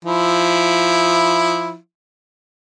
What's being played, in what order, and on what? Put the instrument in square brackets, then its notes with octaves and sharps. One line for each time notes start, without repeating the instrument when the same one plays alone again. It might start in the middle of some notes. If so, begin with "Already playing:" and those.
[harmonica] F3 E4